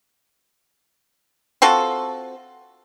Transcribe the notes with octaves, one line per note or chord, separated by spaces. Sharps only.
C4 F4 F#4 A4